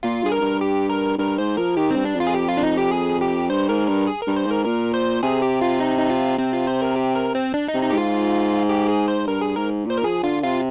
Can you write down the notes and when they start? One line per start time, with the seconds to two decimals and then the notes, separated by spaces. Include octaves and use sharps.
0.03 A#2 F4
0.23 G2 G#4
0.32 A#4
0.41 G2
0.61 G4
0.90 A#4
1.18 G2 A#4
1.38 G#2 C5
1.57 F3 A#4
1.77 D#3 G4
1.91 C4
1.96 G2
2.05 D4
2.15 F2
2.20 F4
2.27 G#4
2.34 G4
2.49 F4
2.57 D4
2.63 D#4
2.77 G4
2.91 G#4
3.21 G4
3.50 G2 C5
3.69 G#2 A#4
3.88 G2 A#4
4.07 G#4
4.22 G2 A#4
4.36 C5
4.46 G#2 A#4
4.65 A#2 A#4
4.94 C5
5.23 C3 G#4
5.42 G4
5.62 F4
5.80 D#4
5.99 D#4
6.10 F4
6.38 C3 C4
6.53 F4
6.67 C5
6.82 A#4
6.96 G4
7.15 A#4
7.35 C4
7.54 D4
7.68 D#4
7.74 C3
7.83 D#4
7.90 G#2 G4
7.97 F4
8.69 G4
8.89 G#4
9.08 C5
9.27 G2 A#4
9.42 G#4
9.56 G#2 A#4
9.86 A#2 C5
9.98 A#4
10.04 F3 G#4
10.23 D3 F4
10.43 C3 F4